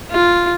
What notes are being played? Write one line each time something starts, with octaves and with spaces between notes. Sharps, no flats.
F4